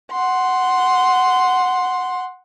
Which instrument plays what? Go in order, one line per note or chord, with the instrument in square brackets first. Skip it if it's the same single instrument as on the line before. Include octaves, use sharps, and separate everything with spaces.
[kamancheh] F#5 C6